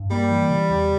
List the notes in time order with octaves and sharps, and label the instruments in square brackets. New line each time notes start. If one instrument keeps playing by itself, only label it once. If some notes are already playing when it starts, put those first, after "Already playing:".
Already playing: [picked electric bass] G2
[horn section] G3 [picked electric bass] A#3
[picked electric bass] E3
C#3
E2